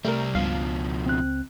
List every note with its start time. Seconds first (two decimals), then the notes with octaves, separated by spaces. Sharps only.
0.05 C2 G3 A3 A#4
0.35 C#2 G2 B2 F3 F5
1.06 C4 F#6